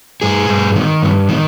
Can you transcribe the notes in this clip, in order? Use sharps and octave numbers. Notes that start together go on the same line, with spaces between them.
G2 G#4
G2
D#3
G2
D#3